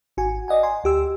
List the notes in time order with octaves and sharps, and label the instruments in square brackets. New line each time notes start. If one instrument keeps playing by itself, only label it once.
[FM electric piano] G#1 F#4 G#5
D5 D#5 F#5 G#5
G#5 A#5 C6
D2 G4 E6